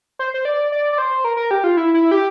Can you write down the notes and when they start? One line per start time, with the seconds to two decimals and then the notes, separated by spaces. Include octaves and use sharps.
0.19 C5
0.34 C5
0.45 D5
0.72 D5
0.93 D5
0.98 C5
1.25 A#4
1.37 A#4
1.51 G4
1.64 F4
1.77 E4
1.94 E4
2.11 G4